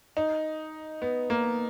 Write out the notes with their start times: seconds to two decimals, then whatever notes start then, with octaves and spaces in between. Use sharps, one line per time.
0.17 D#4
1.02 B3
1.30 A#3